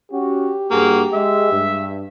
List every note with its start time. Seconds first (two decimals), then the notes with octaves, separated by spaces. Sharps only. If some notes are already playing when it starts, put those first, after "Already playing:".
0.12 C#4 F#4 G4
0.71 G2 A#3 F#4 G#4
1.13 G#3 E5
1.52 G2